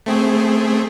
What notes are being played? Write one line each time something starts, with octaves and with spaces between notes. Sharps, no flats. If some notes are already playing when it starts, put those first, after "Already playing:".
A3 C4 G#4